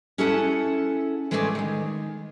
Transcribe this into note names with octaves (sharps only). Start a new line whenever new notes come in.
C#4 E4 G#4 A4 F#5 A5
E3 G#3 A3 C4 G#4 D5
D#3 G#3